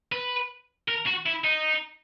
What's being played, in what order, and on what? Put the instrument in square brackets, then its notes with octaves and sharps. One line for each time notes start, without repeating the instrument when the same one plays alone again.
[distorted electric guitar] B4
A#4
F#4
E4
D#4